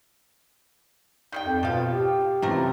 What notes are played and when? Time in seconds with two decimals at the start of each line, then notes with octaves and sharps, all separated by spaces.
1.32 D#3 G3 G5 G6
1.45 F2
1.63 B2 F3 F4 F5
1.91 F4 G4
2.42 F#2 C3 E3 F3 A3 A#4